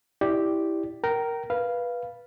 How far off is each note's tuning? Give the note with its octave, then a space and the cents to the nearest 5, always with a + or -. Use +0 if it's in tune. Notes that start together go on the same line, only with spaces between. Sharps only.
E4 -10 G4 +0 D5 +0
A#4 +0 G5 -30
B4 -15 F5 -10